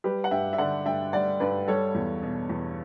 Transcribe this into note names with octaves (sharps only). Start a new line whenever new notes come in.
G3 G4 B4
F#5
G2 E5 G5
E5
D3 D5 F#5
G2 E5 G5
G3 D5 F#5
G2 B4 D5
G3 A4 C#5
E2
B2
E2